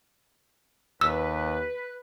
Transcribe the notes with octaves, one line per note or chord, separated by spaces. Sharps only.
D#2 B4 E6